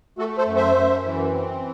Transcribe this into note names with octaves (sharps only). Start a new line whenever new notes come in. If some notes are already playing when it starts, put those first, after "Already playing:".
A3 F#4 A4
A4 C5
F#2
C5 E5
F#2
E3
C4